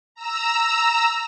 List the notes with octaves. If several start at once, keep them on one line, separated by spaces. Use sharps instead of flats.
A#5 E6